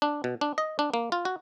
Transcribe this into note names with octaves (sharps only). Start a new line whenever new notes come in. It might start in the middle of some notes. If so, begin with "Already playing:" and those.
D4
B2
D4
D#5
D4
A#3
F4
F#4